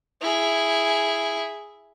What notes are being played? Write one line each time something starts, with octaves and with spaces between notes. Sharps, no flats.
E4 G#4